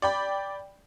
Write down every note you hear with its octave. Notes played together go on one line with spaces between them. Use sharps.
D5 G5 B5